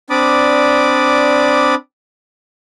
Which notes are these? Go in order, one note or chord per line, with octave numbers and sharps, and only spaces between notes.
C4 D4 D5 B5 D6 D#6